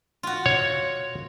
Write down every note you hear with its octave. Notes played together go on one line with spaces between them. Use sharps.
F4 F#4
C#5